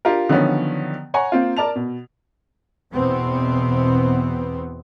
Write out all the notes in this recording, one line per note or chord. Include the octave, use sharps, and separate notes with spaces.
D4 F4 G4 A#4
D3 D#3 F3 F#3 B3 C#4
C#5 F#5 G#5 A#5 C#6
A#3 C4 F4
A#4 D5 A5 F7
B2
E2 B2 B3 C4